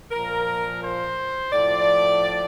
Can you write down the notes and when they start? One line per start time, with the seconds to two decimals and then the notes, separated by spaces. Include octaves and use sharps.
0.12 A#2 F3 A#4
0.82 C5
1.53 A2 F3 D5